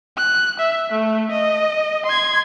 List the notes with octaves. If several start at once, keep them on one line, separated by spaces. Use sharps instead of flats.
F#6
E5
A3
D#5
C6 G#6